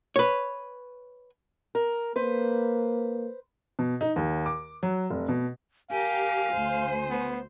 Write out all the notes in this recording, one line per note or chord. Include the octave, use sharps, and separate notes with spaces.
B4 C#5
A#4
A#3 B4 C5
B2
D#4
D#2
D6
F#3
F1
B2
G4 A#4 F5 G#5
D2 C5
B3